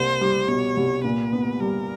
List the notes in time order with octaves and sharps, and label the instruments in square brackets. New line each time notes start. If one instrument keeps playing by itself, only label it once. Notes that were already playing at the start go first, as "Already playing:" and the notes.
Already playing: [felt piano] C2 A#3 [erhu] C5
[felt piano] G3
[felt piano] B2 [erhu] C#5
[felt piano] C2
[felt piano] A#2 [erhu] B4
[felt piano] B3
[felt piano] G3 [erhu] A#4